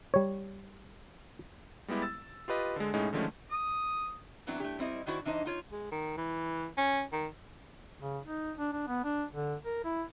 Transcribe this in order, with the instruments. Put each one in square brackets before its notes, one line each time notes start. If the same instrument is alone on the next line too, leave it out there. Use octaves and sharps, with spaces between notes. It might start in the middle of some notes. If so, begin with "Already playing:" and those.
[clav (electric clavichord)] G3 C#5
[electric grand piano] G3 G#3 B3 E4 G4
E6 A6
F4 G4 B4 D#5
D3 G#3
A2 G#3 C#4 D#4
D3 D#3 F3 G#3 A3 C#4
[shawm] D#6
[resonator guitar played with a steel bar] E3 F#3 B3 C4 D4 E4
A3 E4 G4
G3 C4 E4 D#5
D#3 D4 E4 F#4 C5 D5
E3 D4 D#4 C5 D#5
D#4 F4 C#5
[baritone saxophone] G#3
D#3
E3
C#4
D#3
[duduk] C#3
D#4
D4
D4
B3
D4
D3
A#4
E4